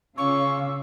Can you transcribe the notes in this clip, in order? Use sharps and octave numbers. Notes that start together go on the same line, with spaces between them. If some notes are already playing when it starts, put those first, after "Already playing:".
C#3 C#4 F4 F5 C#6 D6 E6